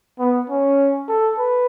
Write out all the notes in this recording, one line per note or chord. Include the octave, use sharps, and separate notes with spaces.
B3
C#4
A4
B4